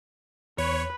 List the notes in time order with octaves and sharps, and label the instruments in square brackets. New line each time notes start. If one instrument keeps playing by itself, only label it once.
[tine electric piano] E2 [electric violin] B4 [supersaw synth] C#5